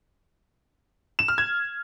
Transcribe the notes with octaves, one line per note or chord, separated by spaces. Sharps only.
E7
F6
G#6